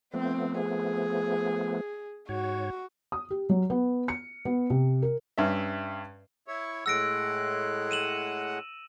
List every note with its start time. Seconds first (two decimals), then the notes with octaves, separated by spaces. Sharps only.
0.14 F3 A3 B3 C4
0.59 G#4
2.29 G#2 F#4 C#5
3.12 D#6
3.30 G4
3.49 F#3
3.70 B3
4.08 C#7
4.45 B3
4.70 C3
5.02 A#4
5.38 G2 C#4 E5
6.48 E4 C#5
6.86 A2 G#3 F#5 E6 A#6 D7
7.91 D#7 E7 F#7